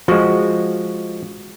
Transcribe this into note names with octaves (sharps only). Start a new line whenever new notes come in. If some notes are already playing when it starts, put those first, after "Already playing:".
F3 G#3 F#4